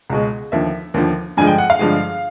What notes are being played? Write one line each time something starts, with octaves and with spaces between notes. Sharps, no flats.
C#2 B2 G#3
D#2 D3 F3 E5
D#2 D3 F3
G2 D3 F3 G#3 G#5
G5
F#5
F5
G2 D3 F3 G#3